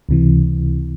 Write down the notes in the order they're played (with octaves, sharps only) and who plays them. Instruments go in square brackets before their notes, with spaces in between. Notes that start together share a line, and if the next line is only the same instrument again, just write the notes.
[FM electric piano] C#2 C3 E3